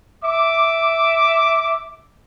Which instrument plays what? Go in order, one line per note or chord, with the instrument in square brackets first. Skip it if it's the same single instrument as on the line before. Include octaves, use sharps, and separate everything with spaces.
[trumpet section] E5 D6